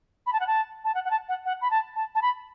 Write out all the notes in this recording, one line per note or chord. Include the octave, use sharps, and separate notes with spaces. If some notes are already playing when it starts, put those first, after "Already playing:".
B5
A5
F#5
A5
A5
F#5
F#5
A5
F#5
F#5
B5
A5
A5
A5
B5